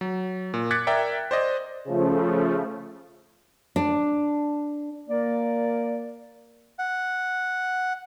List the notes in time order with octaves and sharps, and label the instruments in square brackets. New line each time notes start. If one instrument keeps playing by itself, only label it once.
[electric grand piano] F#3
A#2
D6 F#6 G#6 A6 B6 C#7
A#4 D5 E5 G5 A#5
C5 D5 D#5
[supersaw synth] C#3 F3 A3
[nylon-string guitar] D4
[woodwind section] A#3 A#4 D5
[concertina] F#5